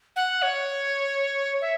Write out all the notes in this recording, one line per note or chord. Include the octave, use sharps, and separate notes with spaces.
F#5
C#5
E5